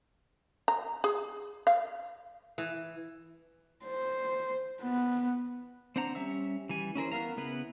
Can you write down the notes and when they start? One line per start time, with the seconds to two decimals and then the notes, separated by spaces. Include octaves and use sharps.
0.68 A#5
1.04 G#4
1.67 F5
2.58 E3
3.86 C5
4.82 B3
5.96 C4 D4 C5 F#5 A#5
6.15 G3 C#4 E5 E6
6.69 E3 G3 G#5
6.95 C#4 E4 A#4 C5
7.12 B3 A#4 F5 A#5
7.37 C#3 B3 E4 B4